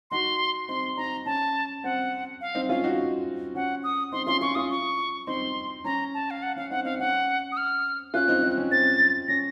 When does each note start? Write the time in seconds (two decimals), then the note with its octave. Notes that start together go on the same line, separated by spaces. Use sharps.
0.11 D#4 F#4 C6
0.68 C4 D#4 C6
0.97 C4 D#4 A#5
1.25 C#4 A5
1.84 C4 F#5
2.41 F5
2.55 C4 D#4
2.69 C#4 F4 F5
2.84 D#4 F#4
3.55 C#4 F#5
3.84 D#6
4.12 C4 D#4 C6
4.26 C#4 F4 C6
4.41 C#4 F4 C#6
4.55 C#4 F4 D#6
4.70 C#6
5.27 C4 D#4 C6
5.84 C#4 A#5
6.14 A5
6.30 F5
6.43 F#5
6.56 C#4 F5
6.70 C4 D#4 F#5
6.85 C4 D#4 F5
6.99 C#4 F#5
7.52 D#6
7.57 F6
8.14 C#4 F4 F#6
8.28 C4 D#4
8.43 C4 D#4
8.57 C#4
8.71 C4 A6
9.28 C#4 A#6